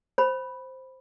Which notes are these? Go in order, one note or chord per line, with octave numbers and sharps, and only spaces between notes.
C5 B5